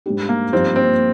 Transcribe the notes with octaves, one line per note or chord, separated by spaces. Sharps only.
G#2 G3 D4 G4
A#3
G2 F3 A#3 C4 D#4 G4
C4